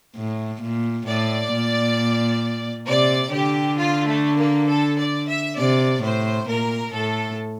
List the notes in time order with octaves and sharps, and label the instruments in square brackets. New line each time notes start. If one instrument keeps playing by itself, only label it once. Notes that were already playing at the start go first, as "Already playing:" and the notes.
[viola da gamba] A2
A#2
[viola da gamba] A2 [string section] D5
[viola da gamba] A#2
[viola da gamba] C3 [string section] D5
[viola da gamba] D3 [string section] G4
[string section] F4
A3
A#3
A4
D5
E5
[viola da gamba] C3 [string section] D5
[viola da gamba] A2 [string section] C5
[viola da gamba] A#2 [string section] A#4
[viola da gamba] A2 [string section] A4